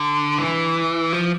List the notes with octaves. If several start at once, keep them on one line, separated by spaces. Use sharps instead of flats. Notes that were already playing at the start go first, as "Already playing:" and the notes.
Already playing: D3
E3
F3